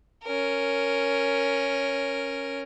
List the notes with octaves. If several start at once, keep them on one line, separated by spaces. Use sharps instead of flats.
C#4 A#4